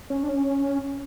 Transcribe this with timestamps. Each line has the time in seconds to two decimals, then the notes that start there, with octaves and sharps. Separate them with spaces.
0.10 C#4
0.23 D4
0.29 C#4